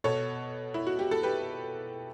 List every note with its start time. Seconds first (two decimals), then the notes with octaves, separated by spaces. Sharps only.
0.04 B2 A4 C#5
0.74 E4
0.87 F#4
0.99 G4
1.11 A4
1.23 G4 B4